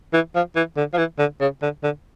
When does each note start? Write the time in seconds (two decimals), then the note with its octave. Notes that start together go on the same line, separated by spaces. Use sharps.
0.13 E3
0.35 F3
0.56 E3
0.77 D3
0.93 F3
0.97 E3
1.19 D3
1.41 C#3
1.62 D3
1.83 D3